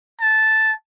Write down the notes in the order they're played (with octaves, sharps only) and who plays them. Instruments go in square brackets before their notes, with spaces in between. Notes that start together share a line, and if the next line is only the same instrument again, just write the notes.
[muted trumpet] A5